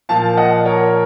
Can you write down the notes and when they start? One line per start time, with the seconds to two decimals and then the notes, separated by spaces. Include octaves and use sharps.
0.09 A#2 F3 A#3 F5 A5
0.28 A5
0.37 D#5 F#5
0.65 A#4 C#5